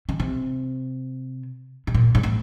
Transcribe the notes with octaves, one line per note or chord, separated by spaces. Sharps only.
C#3
C3
A2
A#2
G#2
A2